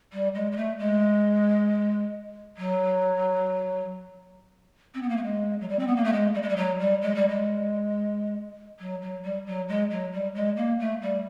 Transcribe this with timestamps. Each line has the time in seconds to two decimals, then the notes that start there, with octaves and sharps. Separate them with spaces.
0.12 G3
0.34 G#3
0.51 G#3
0.56 A3
0.78 G#3
2.57 F#3
4.94 C4
5.02 B3
5.09 A#3
5.17 A3
5.23 G#3
5.60 F#3
5.68 G3
5.79 C4
5.87 B3
5.95 A#3
6.04 A3
6.12 G#3
6.34 G3
6.42 G#3
6.48 G3
6.56 F#3
6.79 G3
7.01 G#3
7.15 G3
7.28 G#3
8.79 F#3
9.01 F#3
9.23 G3
9.46 F#3
9.68 G#3
9.90 F#3
10.12 G3
10.34 G#3
10.56 A#3
10.79 A3
11.01 G3